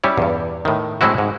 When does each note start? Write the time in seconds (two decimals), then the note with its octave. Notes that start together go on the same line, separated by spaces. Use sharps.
0.04 G3 C#4 E4 C#5
0.17 E2 G2
0.65 A2 D#3
1.01 A2 F#3 G#3 C4 E4 F#4
1.18 G#2